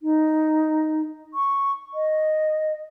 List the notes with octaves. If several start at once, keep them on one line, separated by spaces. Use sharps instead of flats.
D#4
C#6
D#5